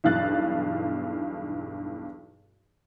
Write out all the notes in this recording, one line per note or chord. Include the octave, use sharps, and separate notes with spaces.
B1 E2 G2 F5 F#6 A6